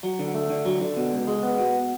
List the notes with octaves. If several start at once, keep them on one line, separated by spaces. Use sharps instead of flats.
F#3
D3
A3
D3
F#3
D3
B2
C#2
G#3
B3
B2